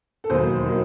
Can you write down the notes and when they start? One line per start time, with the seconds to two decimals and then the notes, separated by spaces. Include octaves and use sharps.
0.24 A4
0.30 E1 D#2 D#3 F#3 C5
0.64 D#3 F#3